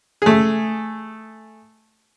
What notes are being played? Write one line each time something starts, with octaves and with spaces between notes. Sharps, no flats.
A3 G#4